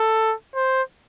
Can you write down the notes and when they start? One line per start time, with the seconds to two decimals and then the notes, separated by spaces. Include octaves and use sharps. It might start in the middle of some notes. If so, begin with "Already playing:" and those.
Already playing: A4
0.56 C5